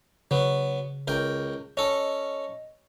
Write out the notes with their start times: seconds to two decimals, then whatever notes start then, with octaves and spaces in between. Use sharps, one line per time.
0.31 C#3 F#3 B3
1.08 C#2 A#4 G5
1.77 C#4 A4 D#5